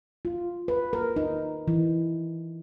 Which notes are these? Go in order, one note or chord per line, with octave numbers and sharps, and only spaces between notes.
F4
B4
A#4
D#4
E3